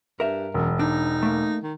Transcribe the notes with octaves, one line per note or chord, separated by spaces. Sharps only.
G2 A#4 E5
E1 F#2
D4 D#4
A3 A#3
D#3